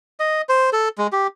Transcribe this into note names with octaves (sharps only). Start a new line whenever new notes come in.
D#5
C5
A4
G#3
G4